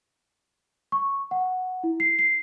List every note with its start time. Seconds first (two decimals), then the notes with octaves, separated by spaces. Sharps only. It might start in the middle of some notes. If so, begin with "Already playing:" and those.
0.92 C#6
1.31 F#5
1.84 E4
2.00 C7
2.19 C7